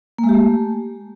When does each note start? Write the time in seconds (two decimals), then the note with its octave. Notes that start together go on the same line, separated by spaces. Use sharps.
0.18 A#3
0.24 G#3
0.29 G4
0.34 A3